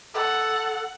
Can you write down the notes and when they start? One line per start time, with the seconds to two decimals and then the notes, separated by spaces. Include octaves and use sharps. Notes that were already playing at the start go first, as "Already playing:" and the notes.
0.14 A4 F#5